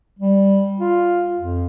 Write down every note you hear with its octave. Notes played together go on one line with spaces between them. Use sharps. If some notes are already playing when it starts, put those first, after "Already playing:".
G3
F4
F2